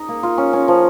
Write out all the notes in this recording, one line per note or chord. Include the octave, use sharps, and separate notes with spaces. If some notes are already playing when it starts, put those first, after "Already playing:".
Already playing: D#4
A#3
F4
C#4
C#4
F3